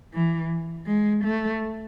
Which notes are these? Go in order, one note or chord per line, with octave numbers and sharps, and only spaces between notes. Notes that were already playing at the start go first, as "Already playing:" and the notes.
E3
G#3
A3